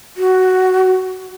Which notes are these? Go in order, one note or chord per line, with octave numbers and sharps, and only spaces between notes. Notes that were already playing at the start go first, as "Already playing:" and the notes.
F#4